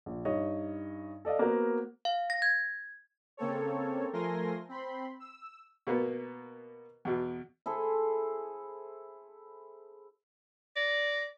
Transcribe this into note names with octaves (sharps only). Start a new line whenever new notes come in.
A#1
G2 D#4 C#5 D#5
A4 D5 D#5 F5
A#3 B3 F#4 A#4 C5
F5
A#6
G#6
C#3 A#3 C4 A4 C#5
F3 A3 A#4 G#5 C6 A#6
C4 B5 C6
E6
B2 A#3 B3
E2 B2
E4 G#4 A4 C5
D5 A#6